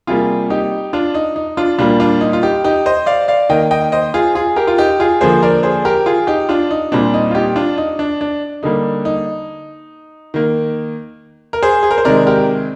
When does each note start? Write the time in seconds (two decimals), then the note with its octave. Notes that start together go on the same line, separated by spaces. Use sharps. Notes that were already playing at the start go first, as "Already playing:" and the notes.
0.07 C3 G3 A#3 F4 G#4
0.50 D#4 G4
0.93 D4 F4
1.14 D#4
1.36 D#4
1.57 D4 F4
1.79 A#2 G3 A#3 D4 F4
2.00 D4 F4
2.21 D#4
2.33 F4
2.43 D#4 G4
2.64 D#4 G4
2.86 C5 D#5
3.06 D5 F5
3.28 D5 F5
3.49 D#3 A#3 D#5 G5
3.71 D#5 G5
3.92 C5 D#5
4.14 F4 G#4
4.35 F4 G#4
4.56 G4 A#4
4.67 F4
4.78 D#4 G4
5.00 F4 G#4
5.21 D3 F3 A#3 G#4 C5
5.43 A#4 D5
5.63 G#4 C5
5.85 G4 A#4
6.06 F4 G#4
6.27 D#4 G4
6.49 D4 F4
6.71 D#4
6.92 A#2 G3 C4 D4
7.14 D#4
7.31 F4
7.34 D#4 G4
7.56 D4 F4
7.78 D#4
7.99 D4
8.21 D4
8.63 D3 G3 A#3 D#4
9.05 D#4
10.34 D#3 A#3
11.53 A#4
11.63 G#4 C5
11.83 G#4
11.91 A#4
11.98 C5
12.05 C3 D#3 G#3 A#4 D5
12.27 G4 A#4